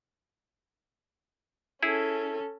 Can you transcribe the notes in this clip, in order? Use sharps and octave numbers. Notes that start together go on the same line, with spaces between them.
C#4 E4 G#4 A4